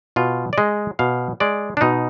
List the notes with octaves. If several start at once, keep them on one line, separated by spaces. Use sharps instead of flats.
B2 F4
D5
G#3 D#5
B2 F5
G#3 D5
D4
B2 D#4